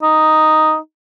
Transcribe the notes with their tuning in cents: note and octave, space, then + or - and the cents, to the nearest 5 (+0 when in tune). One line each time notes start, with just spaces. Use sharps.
D#4 +0